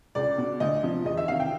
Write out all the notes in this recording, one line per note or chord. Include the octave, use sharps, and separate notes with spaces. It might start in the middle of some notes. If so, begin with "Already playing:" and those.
C#2 D5
B2
D2 D#5
C3 F3
E2 D#5
E5
C3 D#3 F5
G5